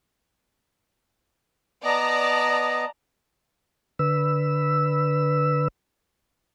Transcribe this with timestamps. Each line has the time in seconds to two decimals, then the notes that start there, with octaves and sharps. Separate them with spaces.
1.84 B3 D5 D#5 A5 A#5
3.99 D3 B4 E6